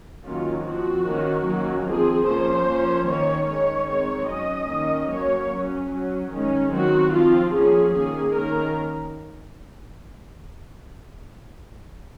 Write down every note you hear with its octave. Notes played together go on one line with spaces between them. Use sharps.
D#3 F#3 A#3 C#4 F4
F3 C4 F#4
D#3 A#3 C#4
D#3 F#3 A#3 C#4
F3 C4 G#4
F3 A#3 C#4 C5
F3 A#3 C#4
D#3 A#3 C#4 C#5
D#3 G#3 C#4 C#5
D#3 G#3 C4 C#5
F#3 C#4 D#5
D#3 A#3 C#4
F#3 A#3 C#4 C#5
F#3 C#4
F#3 C#4
D#3 G#3 C#4
D#3 F#3 C4 F#4
F3 C4 F4
F3 A#3 C#4 G#4
D#3 A#3 C#4 G#4
D#3 A#3 C#4 A#4